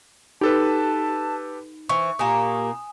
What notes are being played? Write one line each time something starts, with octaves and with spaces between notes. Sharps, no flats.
D#4 G4 A4 B4 A5
E3 C5 C#6
A#2 A#3 G4 G#5 D#6